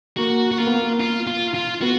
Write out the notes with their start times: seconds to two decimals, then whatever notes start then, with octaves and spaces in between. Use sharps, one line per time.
0.17 A#3 F#4
0.52 F#4
0.58 A#3 F4
0.67 B3
0.74 A#3
1.00 F4
1.27 F4
1.54 F4
1.82 B3 F#4